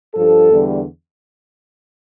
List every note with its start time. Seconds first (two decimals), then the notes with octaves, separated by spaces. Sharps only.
0.15 G2 F3 A4
0.50 E2 D3 G3